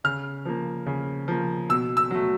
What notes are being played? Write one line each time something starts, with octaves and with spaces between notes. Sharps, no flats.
C#3 F6
F3 A#3
C#3
F3 A#3
B2 E6
E6
F#3 A3